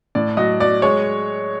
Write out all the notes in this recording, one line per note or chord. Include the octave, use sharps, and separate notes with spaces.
A2 D5
F#3 D#5
F#3 D5
G#3 C#5